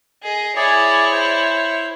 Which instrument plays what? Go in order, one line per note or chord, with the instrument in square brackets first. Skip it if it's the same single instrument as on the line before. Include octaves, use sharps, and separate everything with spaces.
[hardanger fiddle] G#4 D#5
[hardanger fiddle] E4 C#5 [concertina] G#4 D5
[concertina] C5